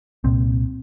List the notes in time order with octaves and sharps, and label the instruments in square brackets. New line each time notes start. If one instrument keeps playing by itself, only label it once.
[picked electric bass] C2 A#2 C4